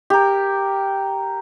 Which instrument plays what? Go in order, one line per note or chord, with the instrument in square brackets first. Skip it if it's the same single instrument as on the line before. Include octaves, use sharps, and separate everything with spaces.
[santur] G4 A#4